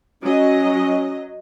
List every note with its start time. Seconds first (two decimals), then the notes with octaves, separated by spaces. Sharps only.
0.23 F#3 C#4 D#5